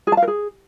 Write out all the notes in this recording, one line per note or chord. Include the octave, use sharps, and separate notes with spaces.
G#4
A5
F5
A#4
G#4